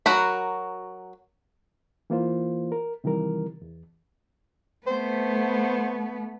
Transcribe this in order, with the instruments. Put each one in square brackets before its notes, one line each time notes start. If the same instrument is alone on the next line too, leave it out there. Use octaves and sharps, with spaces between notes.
[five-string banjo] F#3 F#4 A#4 B5
[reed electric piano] E3 A#3 F4 C5
A#4
C3 D#3 E3 G3 A#4
E2
[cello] A3 B3 [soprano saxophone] C5